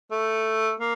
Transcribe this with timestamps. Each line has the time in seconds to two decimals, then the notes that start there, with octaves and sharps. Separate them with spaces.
0.12 A3
0.80 A#3